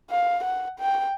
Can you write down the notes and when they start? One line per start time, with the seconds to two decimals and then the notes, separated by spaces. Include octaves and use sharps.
0.10 F5
0.44 F#5
0.80 G5